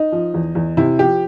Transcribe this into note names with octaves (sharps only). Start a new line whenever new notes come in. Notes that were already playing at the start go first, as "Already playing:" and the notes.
Already playing: D#4
F3
E2
E2
C3 E4
F3 G4